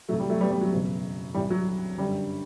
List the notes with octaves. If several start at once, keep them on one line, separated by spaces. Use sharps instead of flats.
C2 C3 E3 F#3 A3
G3
F#3 A3
G3 B3
G3
F#3
F#1 E2 B2
C2 C3 E3 G3
F#3
G1 F#2 D3 G3